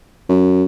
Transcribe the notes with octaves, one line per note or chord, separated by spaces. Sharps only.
F#2